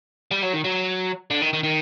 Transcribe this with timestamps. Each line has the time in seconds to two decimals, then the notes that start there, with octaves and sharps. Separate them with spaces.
0.31 G3
0.42 F#3
0.53 D#3
0.64 F#3
1.31 D3
1.42 D#3
1.53 D#3
1.63 D#3